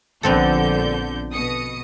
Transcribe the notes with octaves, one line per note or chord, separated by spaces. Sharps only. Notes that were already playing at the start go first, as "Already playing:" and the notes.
A#1 D3 B3 C4 A4 G6
B2 D#6 C#7